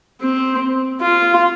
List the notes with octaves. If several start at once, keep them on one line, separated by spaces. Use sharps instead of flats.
C4
F4